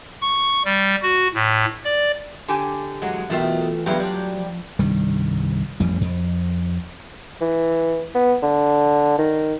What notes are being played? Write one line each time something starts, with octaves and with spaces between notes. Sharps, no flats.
C#6
G3
F#4
A2
D5
D3 G4 G#5
E2 F#3 G#3 F#5
B1 D#3 E3 A3 F4 E5
E2 G2 F#3 E4 F4 G4
G3 D4
F3
C2 G2 D#3 G3
A1 F2 G3
F2
E3
B3
D3
D#3